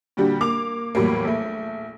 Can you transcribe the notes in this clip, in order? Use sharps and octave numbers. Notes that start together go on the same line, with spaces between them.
A#2 D3 G3 F#4 G4
A#3 D6 F7
E2 A2 F#3 G3 A#3
A#1 A3